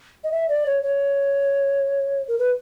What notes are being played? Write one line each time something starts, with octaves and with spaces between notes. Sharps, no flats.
D#5
E5
D5
C#5
C#5
A#4
B4